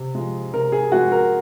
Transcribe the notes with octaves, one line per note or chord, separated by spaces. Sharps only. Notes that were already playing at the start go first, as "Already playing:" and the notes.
Already playing: C3
F3 G#3
C3 A#4
G#4
F3 G#3 F#4
A#4